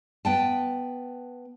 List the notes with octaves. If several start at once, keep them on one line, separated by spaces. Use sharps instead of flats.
B3 G5 A5